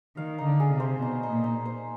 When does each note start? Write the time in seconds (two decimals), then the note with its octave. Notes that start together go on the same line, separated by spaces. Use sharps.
0.17 D#3 F5
0.38 D#4
0.45 D3
0.60 G#4
0.73 C3
0.80 C5
1.01 B2 D#4
1.23 D#4
1.30 A#2
1.44 D#4
1.66 C5